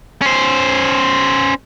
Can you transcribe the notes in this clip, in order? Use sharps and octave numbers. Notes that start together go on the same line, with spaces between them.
C#4 C5